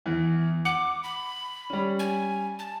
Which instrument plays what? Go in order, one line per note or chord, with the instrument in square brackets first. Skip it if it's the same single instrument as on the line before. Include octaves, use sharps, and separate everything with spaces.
[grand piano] E2 E3
[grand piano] F#5 C#7 F#7 [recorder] D6
[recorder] B5
[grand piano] G3 C#4
[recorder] G#5
A5